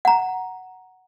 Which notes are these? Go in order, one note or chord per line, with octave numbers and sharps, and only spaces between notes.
F#5 A#5